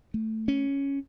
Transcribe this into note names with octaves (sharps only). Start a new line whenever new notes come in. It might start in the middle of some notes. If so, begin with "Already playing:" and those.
A3
C#4